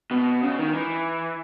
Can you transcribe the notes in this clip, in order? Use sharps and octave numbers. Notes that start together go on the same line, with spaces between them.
B2
C#3
D#3
E3